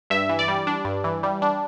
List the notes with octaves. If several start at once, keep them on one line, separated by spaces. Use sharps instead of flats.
G2 E5
E3
D5
G3
D4
G2
E3
G3
D4